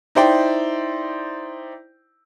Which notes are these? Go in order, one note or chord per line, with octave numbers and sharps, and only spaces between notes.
D#4 E4 C5 D5 G5